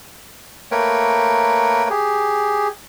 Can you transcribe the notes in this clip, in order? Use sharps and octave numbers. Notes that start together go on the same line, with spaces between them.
A3 A#3 A#4 B4 C#5 G5
G4 G#4